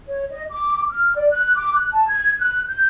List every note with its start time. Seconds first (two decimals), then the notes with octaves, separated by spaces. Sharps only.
0.08 C#5
0.30 D#5
0.50 D6
0.90 F6
1.16 D5
1.30 F#6
1.56 D6
1.74 F#6
1.92 A5
2.07 G#6
2.40 F#6
2.67 G6